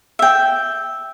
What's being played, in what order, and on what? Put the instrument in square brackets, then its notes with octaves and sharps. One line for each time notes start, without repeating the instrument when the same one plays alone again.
[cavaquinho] E5 G5